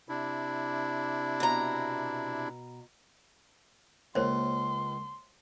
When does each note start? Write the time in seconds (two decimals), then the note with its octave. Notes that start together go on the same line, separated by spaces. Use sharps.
0.09 C3 D4 E4
1.40 B2 A#5
4.15 C#2 A#3 C5 C#5 C6